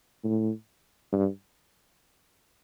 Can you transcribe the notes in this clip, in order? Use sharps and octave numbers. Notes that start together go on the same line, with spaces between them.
A2
G2